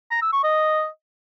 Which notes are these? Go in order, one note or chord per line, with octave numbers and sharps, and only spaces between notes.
A#5
E6
C#6
D#5